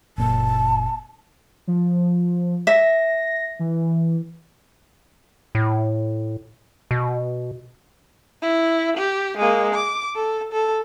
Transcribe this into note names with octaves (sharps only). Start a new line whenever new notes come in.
F#1 A#2 A5
F3
E5 A#6
E3
A2
B2
E4
G4
G#3 A#3
D6
A4
A4